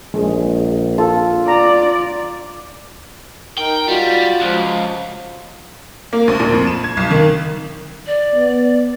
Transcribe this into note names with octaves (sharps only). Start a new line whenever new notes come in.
A#1 G#3
F4 A4
D5 A#5
D#4 A#4 G5
G3 F4 F#4
C#2 F3
A#3
D2
A#2
F2
E7
G#6
B1
D#3
D5
B3